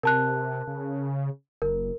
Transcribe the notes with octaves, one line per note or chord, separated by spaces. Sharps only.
C3 A#4 A5 F#6
C#3
F#1 A#4